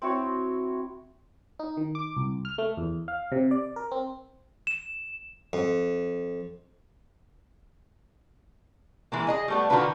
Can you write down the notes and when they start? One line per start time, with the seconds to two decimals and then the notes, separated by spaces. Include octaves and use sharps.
0.02 C4 E4 F#4 C#5
1.59 D#4
1.77 D#3
1.95 D6
2.17 C2
2.45 F6
2.58 A3
2.77 E2
3.08 F5
3.32 C3
3.51 D5
3.76 A#4
3.91 C4
4.67 E7
5.53 F2
9.12 E3 G#3 A#3
9.27 G#4 D#5 G#5
9.48 G3 A3 B3
9.70 D3 D#3 A#3 F4 F#4 B4